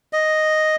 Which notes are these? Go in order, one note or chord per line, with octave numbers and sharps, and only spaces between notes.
D#5